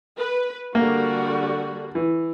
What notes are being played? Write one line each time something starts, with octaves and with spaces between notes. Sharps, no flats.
B4
D3 G3 A#3 F#4
E3